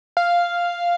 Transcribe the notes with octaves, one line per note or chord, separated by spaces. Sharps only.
F5